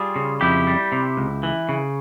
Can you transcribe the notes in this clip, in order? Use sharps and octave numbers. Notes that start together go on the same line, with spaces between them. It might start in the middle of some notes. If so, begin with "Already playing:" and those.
Already playing: G3 F4 G#4
C#3
F2 E4 G4
G3
C3
C#2
E3
C#3